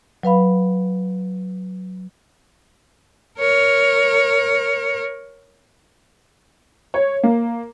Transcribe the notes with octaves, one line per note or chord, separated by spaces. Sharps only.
F#3 B4 F5 B5
A#4 C#5
C#5
A#3